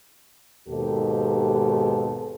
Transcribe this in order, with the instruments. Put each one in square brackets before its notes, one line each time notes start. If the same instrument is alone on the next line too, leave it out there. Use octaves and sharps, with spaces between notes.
[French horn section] D#2 G#2 B2 G4 A4